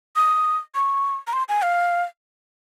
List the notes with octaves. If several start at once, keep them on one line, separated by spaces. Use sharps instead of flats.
D#6
C#6
A#5
C6
G#5
F5